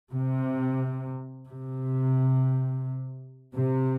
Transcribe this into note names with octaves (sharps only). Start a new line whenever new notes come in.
C3
C3
C3